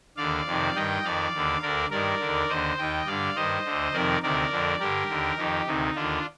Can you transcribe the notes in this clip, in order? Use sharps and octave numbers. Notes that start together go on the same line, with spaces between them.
D#2 D3 D5 F5
F2 C3 D#3
G2 D#3 D#5 G5
F2 D#3 D5 F5
D#2 D3
D2 D3 A#4 D5
G2 D#3 A#4 D5
D3
D#2
D#2 D3 C5 D#5
D#2 D#3 D#5 G5
G2 D3 D5 F5
G2 D#3 C5 D#5
D2 D3
F2 C3 D#3 A#4 D5
D2 C3 D#3 A#4 D5
F2 D3
G2 D3 G4 A#4
D#2 D3
F2 D#3 D#4 G4
D2 C3 D#3 D#4
D#2 D3 D4 F4